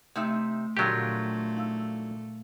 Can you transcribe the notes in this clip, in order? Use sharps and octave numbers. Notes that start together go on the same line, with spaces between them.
C3 A3 D#4 E5
F2 A#2 D3 F#3 A3 F4 G4
D#4 F5 E6